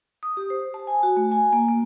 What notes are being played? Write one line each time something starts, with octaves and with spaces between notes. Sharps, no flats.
D#6
G4
C5
A5
G#5
F#4
A3
G#5
A#3
A#3